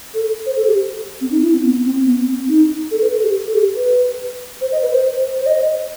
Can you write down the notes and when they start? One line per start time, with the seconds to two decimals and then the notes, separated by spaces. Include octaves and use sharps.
0.14 A4
0.46 C5
0.57 A4
0.67 G4
1.21 C4
1.31 D#4
1.42 E4
1.53 C4
1.63 B3
1.85 C4
2.06 B3
2.27 C4
2.48 D#4
2.91 A4
3.01 B4
3.12 A4
3.23 G4
3.46 A4
3.55 G4
3.76 B4
4.61 C5
4.72 D#5
4.82 B4
4.93 C5
5.41 C5
5.46 D#5